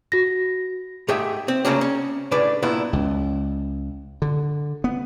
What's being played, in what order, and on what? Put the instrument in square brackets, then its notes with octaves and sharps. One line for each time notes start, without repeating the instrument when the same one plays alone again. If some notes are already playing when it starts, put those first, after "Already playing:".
[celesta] F#4 A#6
[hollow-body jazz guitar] G#2 A3 G4 G#4 E5 G5
C4
C#3 F#3 A3 A#3 C#4 D4
C#4
A2 C#3 D4 B4 D5
G2 A#2 B3 D4 E4
[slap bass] C#2
D3
B3